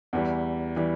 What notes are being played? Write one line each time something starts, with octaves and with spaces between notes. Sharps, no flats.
E2 E3 G3
E3 G3